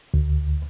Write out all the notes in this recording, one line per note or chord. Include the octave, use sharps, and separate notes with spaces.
D2